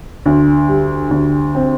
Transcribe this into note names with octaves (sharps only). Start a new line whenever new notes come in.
D2
G3
D2
C4